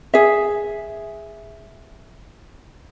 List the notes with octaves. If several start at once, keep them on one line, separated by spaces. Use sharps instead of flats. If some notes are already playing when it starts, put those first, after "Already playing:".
G#4 E5